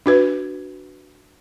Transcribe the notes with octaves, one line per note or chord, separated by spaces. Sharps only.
D4 F#4 B4